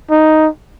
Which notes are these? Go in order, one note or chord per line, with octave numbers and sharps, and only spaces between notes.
D#4